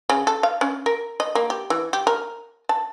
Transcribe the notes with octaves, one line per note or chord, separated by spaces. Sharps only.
C#3
A4
F5
C#4
A#4
D#5
A#3
G4
E3
G4
A#4
A5